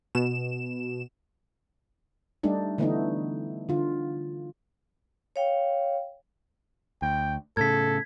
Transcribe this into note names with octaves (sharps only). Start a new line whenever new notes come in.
B2 E7
G3 A3 D4 D#4
D3 E3 A3 B3 D4 D#4
D3 F4
C#5 F5 G5
D2 G5
A2 C#3 A4 G#6 B6